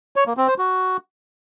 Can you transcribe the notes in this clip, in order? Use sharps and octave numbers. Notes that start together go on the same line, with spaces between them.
C#5
A#3
C4
C5
F#4